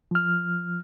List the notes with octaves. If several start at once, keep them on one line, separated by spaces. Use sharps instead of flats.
F3 F6